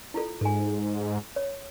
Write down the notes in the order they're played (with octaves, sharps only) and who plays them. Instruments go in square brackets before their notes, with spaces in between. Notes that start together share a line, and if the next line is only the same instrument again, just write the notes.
[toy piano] E4 F4 A4
[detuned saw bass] G#2 [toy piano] A4 G#5
[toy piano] C#5